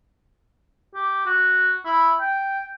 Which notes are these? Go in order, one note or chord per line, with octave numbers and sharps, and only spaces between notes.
G4
F#4
E4
G5